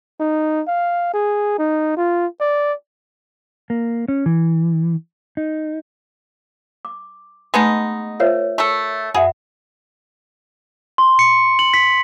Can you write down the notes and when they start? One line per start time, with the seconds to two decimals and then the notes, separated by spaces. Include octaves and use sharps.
0.20 D#4
0.68 F5
1.14 G#4
1.59 D#4
1.97 F4
2.41 D5
3.70 A#3
4.08 C#4
4.26 E3
5.37 D#4
6.85 D6
7.54 G#3 A3 B3 D#4 B4
8.20 F4 A#4 C5 C#5 E5 F5
8.58 A3 A4
9.14 F#2 G#4 E5 F#5 B5
10.98 C6
11.19 C#7
11.59 F#7
11.74 B6